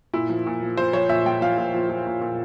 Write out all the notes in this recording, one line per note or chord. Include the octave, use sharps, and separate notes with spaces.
A#2 E4
F3
A#2
F3
F3 C5
F3 C#5
A#2 E5
F3 G5
F3 F5
A#2
F3
F3
A#2
A#2